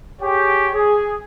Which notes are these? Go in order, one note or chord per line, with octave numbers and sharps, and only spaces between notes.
G4 G#4 C#5 G5
G#4